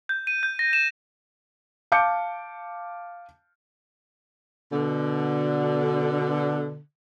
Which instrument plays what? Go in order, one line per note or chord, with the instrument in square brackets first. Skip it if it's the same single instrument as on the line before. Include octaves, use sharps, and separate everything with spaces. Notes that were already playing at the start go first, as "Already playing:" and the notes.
[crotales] G6
D#7
G6
A#6
E7
[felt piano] F5 A5 D6 G6 C#7
[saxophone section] B2 D3